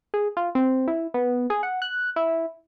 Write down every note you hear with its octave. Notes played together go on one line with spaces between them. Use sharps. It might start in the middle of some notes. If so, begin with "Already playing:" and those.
G#4
F4
C4
E4
B3
G#4
F#5
F#6
E4